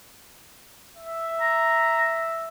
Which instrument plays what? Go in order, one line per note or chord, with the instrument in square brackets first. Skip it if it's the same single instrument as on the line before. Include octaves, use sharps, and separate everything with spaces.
[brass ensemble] E5
[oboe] A#5